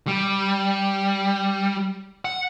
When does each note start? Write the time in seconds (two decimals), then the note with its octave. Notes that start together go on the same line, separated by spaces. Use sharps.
0.07 G3
2.25 F#5